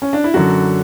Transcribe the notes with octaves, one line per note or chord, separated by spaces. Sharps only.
C#4
D4
E4
F#2 D3 F#3 F#4